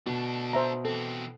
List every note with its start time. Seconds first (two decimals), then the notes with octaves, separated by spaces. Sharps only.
0.06 B2 A3 D4
0.53 C5 E5 A#5
0.85 E3 C4 A4